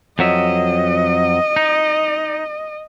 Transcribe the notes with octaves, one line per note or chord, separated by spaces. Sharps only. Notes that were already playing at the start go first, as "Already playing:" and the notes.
F2 F#3 D#5 E5
D#4